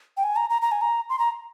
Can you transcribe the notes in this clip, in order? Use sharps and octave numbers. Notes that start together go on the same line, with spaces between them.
G5
G#5
A#5
A#5
A#5
G#5
A#5
C6
A#5